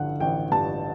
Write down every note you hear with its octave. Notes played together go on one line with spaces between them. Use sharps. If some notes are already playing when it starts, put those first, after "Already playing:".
Already playing: A1 G2 D3 F3 F#5
A1 G5
G2 A5